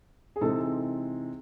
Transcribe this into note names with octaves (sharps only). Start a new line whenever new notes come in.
G#4
C3 E3 G#3 C4 D#4 A4